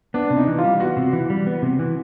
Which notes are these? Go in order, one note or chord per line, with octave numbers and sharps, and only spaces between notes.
B3 D4
C3
D#4
E3
F4
G3
B3 F#4
C3
E3
G3
B3
C3
E3